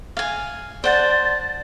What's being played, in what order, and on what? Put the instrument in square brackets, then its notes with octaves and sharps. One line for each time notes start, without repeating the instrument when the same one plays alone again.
[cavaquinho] F5 G#5
[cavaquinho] C5 F#5 A5 [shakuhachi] D5